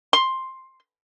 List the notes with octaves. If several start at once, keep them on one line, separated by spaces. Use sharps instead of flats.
C6